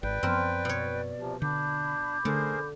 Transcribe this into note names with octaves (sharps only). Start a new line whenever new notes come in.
G#1 B4 D5 G5
F#2 F3 B3 C4 A#4
B2 C#5
C3 F3
D3 D4 B5 D6 G6
D3 A3 G#4 A#4 C5